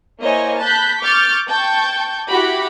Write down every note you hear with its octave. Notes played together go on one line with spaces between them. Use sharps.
A#3 E4 C5 C#5 D#5 G#5
A5 B5 F#6 G6 B6
C#6 D6 F6 G6 A6
G5 A5 C#6 G6
E4 F#4 G4 F#5 B5 D6